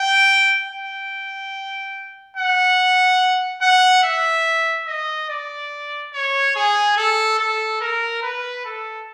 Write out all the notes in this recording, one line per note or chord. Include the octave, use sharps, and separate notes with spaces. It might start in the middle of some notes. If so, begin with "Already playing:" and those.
Already playing: G5
G5
F#5
F#5
E5
D#5
D5
C#5
G#4
A4
A4
A#4
B4
A4